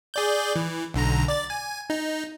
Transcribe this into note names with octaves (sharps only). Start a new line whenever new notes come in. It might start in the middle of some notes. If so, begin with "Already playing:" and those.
G#4 D5 G6
E3
B1 D3 A#5
D5 A6
G#5
D#4